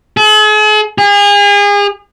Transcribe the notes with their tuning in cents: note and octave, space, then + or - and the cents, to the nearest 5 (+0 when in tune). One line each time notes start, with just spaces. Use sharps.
G#4 +45
G#4 -35